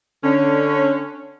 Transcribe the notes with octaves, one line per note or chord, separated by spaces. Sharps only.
D3 C#4